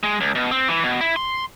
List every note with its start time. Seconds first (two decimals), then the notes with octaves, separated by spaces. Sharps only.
0.03 G#3
0.21 C#2
0.35 B2
0.51 C4
0.68 E3
0.84 B2
1.01 E4
1.16 C6